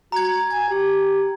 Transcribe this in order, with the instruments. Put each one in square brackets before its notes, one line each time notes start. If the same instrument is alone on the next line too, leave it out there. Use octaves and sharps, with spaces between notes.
[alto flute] F#4 [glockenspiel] A#5 G#6
[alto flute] G#5 [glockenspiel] G#6
[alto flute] G4